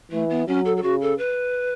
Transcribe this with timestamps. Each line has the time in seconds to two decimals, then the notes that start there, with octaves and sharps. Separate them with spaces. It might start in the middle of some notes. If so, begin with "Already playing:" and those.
0.11 E3 A3
0.30 B3
0.47 F#3 C#4
0.65 A4
0.77 A4
0.82 C#3 F#4
1.01 A4
1.18 B4